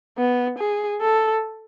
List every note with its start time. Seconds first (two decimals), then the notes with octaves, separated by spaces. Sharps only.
0.18 B3
0.58 G#4
1.01 A4